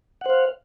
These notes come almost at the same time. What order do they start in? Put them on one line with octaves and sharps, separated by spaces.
F#5 C5 F5